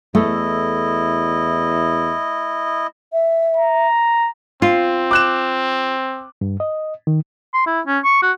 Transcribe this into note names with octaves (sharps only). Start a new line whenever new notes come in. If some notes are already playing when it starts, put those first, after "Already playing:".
E2 A3 E4 D#5
E5
A#5
C4 F4
D6 F#6 E7
G2
D#5
D#3
C6
E4
C#4
C#6
F#4